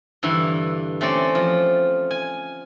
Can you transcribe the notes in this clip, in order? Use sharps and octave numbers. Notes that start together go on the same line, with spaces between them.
G2 D3 E3
A3 C4 C#4 D5
F3
G#5